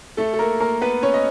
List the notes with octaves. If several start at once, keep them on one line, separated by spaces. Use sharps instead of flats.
A3 A4
A4
A#3 A#4
A#3 A#4
B3 B4
C#4 C#5
D#5